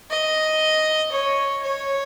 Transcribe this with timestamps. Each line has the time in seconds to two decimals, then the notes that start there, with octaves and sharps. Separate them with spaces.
0.10 D#5
1.12 C#5
1.63 C#5